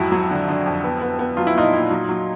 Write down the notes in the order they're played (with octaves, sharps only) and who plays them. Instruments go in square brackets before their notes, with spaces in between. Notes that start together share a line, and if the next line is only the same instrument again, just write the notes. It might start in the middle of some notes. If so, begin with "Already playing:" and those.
Already playing: [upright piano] F2 G#2 F#3 E4 F#4
F#3
D3
D3
F2
B3
B3
B3
F#3 F4
E4
A#2 D#4 F4
A#2
F#3
F#3